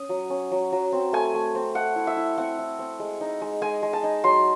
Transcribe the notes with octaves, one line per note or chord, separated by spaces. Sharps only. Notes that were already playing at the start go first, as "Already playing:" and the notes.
Already playing: C#4 D#6
F#3
C#4
F#3
F#3
C4
A3 G#5
A3
C4
A3 F#5
E4
E5
E4
C4 F#5
E4
C4
G#3
D#4
G#3
G#3 G#5
G#3
A5
D#4
F#3 C6